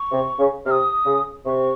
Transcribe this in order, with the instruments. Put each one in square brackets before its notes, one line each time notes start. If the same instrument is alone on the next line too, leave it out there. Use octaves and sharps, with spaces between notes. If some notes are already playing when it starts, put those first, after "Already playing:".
Already playing: [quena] C#6
[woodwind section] C3
C#3
[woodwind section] C3 [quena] D#6 F6
[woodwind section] C#3
[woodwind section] C3 [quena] C#6